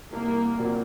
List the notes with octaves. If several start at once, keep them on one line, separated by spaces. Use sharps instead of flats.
C2 A#3
A#2 F#3 C4